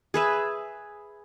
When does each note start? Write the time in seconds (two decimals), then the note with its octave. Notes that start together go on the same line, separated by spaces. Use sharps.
0.14 G#4 B4 E5